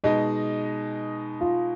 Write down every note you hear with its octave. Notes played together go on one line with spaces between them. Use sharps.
B2 G#3 D#4 D#5
F4